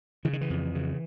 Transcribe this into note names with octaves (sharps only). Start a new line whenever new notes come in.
C#3 E3
D#3
E3
F2
C#3